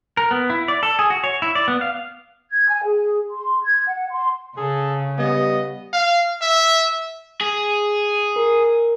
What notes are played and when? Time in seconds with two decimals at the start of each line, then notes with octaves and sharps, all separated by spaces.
0.17 A#4
0.31 B3
0.50 E4
0.68 D5
0.83 A4
0.99 G#4
1.10 F#4
1.24 C#5
1.42 E4
1.55 D5
1.68 B3
1.81 F5
2.50 G#6
2.69 G#5
2.84 G#4
3.30 C6
3.62 G#6
3.87 F#5
4.11 C6
4.57 C#3 G#4 A4
5.18 G3 B3 D#5
5.93 F5
6.42 E5
7.41 G#4
8.36 A#4